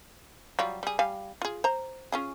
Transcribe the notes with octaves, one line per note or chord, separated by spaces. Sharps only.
F#3 G3 F4
G3 G#4
G3 F5 G#5
F4 G#4
C5 A#5
C#4 F4 G#4